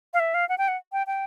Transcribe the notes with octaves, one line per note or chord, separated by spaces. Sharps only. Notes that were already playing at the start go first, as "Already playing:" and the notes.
F5
E5
F5
F#5
G5
F#5
G5
G5